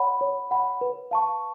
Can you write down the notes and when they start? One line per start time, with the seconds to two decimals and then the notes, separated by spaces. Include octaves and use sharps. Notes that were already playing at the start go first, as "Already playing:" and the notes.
Already playing: C#5 F#5 B5
0.21 C#5
0.51 F#5 B5
0.81 B4
1.11 F5 A5 C#6